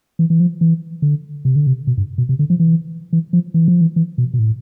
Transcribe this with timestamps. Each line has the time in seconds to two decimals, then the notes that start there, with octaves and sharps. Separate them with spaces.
0.19 E3
0.30 E3
0.40 F3
0.61 E3
1.02 D3
1.45 C3
1.56 D3
1.67 C3
1.87 B2
1.98 G2
2.18 B2
2.29 C3
2.39 D3
2.50 F3
2.60 E3
3.13 E3
3.33 F3
3.54 E3
3.68 F3
3.81 E3
3.96 E3
4.18 B2
4.34 B2
4.39 A2